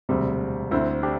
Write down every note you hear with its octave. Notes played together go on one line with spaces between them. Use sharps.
E1 D2 C3 G3 C4
D2 D3 C4 E4
D4 G4